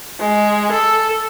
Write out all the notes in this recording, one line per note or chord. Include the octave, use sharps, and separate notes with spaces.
G#3
A4